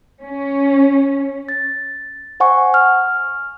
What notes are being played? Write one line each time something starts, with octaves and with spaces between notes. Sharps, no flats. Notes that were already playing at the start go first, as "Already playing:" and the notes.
C#4
A6
C5 F#5 G#5 C#6
F6